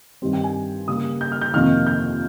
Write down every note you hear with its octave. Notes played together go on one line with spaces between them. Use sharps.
G2 D#3 G3 C4
G5
G#5
C#3 G3 A#3 D#6
G6
F6
G6
F2 C3 D#3 A#3 F6
G6